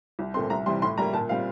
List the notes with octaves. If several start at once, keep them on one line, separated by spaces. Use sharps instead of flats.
C2
A#2 A3 C4 C6
C2 A#5
C3 E3 G3 C6
A2 C6
G3 A#3 A#5
A#2 A5
G3 C4 F5